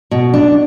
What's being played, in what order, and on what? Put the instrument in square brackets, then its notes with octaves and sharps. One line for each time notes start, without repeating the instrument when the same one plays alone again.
[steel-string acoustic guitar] B2
D4